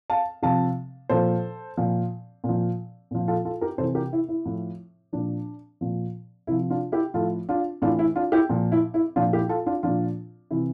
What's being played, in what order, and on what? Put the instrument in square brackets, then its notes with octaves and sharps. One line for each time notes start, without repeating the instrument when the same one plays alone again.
[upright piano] F5 A5
C3 F3 F5 A5
A#2 F3 A4 C5
A#2 F3
A#2
F3
A#2 F3
F4 A4
F4 A4
G4 A#4
C3 E3 A4 C5
G4 A#4
E4
E4
A2 F3
A#2 F3 D4
A#2 F3
C3 F3 E4
D4 F4
E4 G4
A2 F3 F4 A4
D4 F4
A2 E3 D4 F4
E4
D4 F4
E4 G4
A#2 F3
E4
E4
A#2 F3 D4 F4
E4 G4
F4 A4
D4 F4
A#2 F3 D4 F4
C3 E3 E4